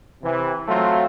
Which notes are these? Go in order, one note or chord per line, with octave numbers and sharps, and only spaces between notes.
C3 E3
F#3 A3 C4 F4